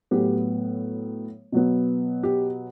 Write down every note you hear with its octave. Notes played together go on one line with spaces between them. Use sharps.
A2 F#3 B3 G4
B2 F#3 B3
G4